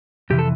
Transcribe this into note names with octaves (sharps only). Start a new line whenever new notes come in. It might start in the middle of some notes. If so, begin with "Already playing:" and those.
F2 C3 E3 G4
A4